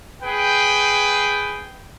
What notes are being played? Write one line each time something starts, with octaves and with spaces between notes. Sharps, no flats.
G#4 B4 G5